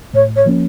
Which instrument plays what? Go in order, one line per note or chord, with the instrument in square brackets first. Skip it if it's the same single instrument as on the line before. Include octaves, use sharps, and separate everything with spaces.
[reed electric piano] A2 [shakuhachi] C#5
[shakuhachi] C#5
[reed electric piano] F3 A#3 C#4